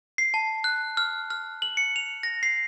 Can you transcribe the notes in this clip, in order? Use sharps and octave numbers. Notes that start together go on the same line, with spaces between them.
C7
A5
F#6
F6
F6
F#7
C#7
F7
A#6
C7